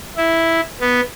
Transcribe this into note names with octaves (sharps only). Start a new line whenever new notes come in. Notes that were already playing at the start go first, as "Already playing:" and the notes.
E4
B3